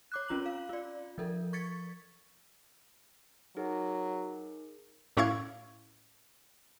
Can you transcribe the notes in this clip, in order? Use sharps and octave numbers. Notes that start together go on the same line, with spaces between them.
C#5 D6 F#6
C4 C#4 F4 A#5 F#7
F5
F4 D5
F3 A4 A#4
C#6 G#6 A6 B6 C#7
F#3 D#4 G#4 A#4
A2 C#4 E4 F5 C#6 G#6